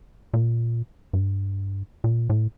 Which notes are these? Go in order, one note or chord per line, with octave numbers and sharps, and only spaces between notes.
A#2
G2
A#2
A2